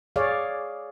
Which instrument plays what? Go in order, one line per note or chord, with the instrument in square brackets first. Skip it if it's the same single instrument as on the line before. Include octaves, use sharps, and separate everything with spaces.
[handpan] G#4 C#5 D5 F5